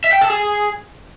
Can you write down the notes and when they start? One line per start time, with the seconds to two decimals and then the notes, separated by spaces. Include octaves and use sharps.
0.04 E5
0.13 G5
0.21 A4
0.30 G#4